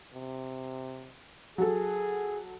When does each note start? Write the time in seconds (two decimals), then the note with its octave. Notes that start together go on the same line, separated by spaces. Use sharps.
0.14 C3
1.58 F#3 G#4 A4